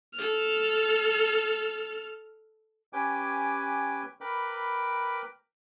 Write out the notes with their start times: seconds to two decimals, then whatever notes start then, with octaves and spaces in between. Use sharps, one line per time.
0.14 A4 F6
2.93 C#4 G4 B4 G5 G#5 D6
4.21 A#4 B4 G5 B5 D6